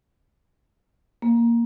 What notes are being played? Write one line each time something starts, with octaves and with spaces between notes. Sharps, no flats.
A#3